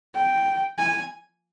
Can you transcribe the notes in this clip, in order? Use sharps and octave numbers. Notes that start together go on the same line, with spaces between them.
G5
G#5